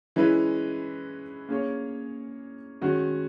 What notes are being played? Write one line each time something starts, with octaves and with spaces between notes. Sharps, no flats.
E3 G#3 C#4 E4 B4
A#3 C#4 G#4 C#5
D#3 G#3 C#4 F#4